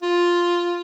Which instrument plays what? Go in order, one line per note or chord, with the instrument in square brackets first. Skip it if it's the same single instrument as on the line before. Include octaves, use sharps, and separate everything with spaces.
[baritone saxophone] F4